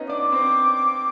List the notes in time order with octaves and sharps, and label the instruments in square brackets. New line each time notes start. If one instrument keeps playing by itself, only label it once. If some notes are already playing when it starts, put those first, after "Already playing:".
Already playing: [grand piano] B3 C#4 D#4 D#5
[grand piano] D4 D5 [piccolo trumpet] D6
[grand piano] C4 C5